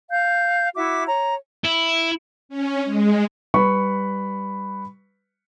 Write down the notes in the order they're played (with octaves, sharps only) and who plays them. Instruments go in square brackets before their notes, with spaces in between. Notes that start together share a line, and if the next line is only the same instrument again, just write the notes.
[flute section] F5 G6
E4 F#4 E5 D6
C#5 A#5
[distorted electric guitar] E4
[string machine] C#4
G#3
[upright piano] G3 B4 B5 C#6